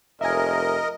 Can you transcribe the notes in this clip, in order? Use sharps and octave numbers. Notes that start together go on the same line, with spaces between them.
F1 A#4 D#5 E5 G#5